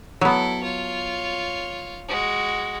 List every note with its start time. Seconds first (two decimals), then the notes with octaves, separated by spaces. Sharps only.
0.21 F#3 B3 E4 A4
0.63 F4 C#5
2.08 G#3 F#4